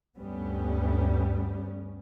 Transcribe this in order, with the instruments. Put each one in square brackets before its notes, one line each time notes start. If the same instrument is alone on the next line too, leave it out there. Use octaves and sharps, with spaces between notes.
[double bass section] D2 G2 G3 B3 C#4